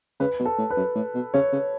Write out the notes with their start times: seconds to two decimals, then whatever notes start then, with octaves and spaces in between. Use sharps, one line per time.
0.20 C#3 B4
0.40 B2
0.46 A4
0.58 A2
0.70 B4
0.77 F#2
0.95 A2
1.14 B2
1.34 C#3 C#5
1.53 C#3